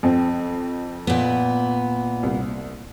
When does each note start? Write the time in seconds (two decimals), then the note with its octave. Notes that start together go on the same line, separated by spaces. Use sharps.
0.03 F2 C4
1.07 A#2 B3
2.23 C2